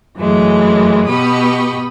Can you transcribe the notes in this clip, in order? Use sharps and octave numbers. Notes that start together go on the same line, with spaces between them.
F#2 E3 F#3 G#3 A3
B2 G4 B5 C#6 D#6